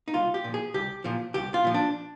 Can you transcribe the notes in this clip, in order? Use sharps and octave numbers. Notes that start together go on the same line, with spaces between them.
D#4
C2 F4
G4
A#2 F3
G#4
C2 G4
A#2 F3
C2 G4
F4
A#2 F3
D4